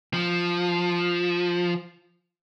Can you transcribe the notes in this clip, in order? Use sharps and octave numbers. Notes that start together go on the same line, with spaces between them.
F3